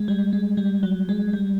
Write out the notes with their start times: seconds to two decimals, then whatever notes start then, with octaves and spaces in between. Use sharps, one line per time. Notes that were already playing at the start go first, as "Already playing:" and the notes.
Already playing: G#3
0.08 G3
0.33 G#3
0.57 G3
0.83 F#3
1.09 G#3
1.33 G3